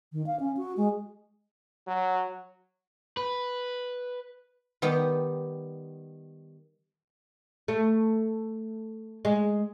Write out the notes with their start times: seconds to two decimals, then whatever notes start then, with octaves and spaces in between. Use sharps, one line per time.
0.13 D#3
0.26 F5
0.40 C#4
0.57 F#4
0.77 G#3
1.87 F#3
3.17 B4
4.82 D#3 G3 B3 G4
7.68 A3
9.25 G#3